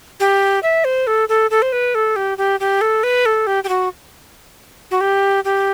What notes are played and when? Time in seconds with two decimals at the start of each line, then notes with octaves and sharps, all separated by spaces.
0.20 G4
0.63 E5
0.85 C5
1.07 A4
1.29 A4
1.51 A4
1.62 C5
1.72 B4
1.95 A4
2.16 G4
2.38 G4
2.60 G4
2.81 A4
3.03 B4
3.26 A4
3.47 G4
3.64 G4
3.69 F#4
4.91 F#4
5.01 G4
5.45 G4